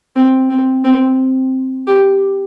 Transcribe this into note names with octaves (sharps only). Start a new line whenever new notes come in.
C4
C4
C4
G4